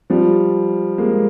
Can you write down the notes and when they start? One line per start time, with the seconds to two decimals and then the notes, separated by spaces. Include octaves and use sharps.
0.10 F3 G3
0.98 G#3 A#3